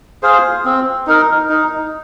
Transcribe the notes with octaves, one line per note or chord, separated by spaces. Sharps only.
G#4 C5 F5
C4
D#4 A#4
D#4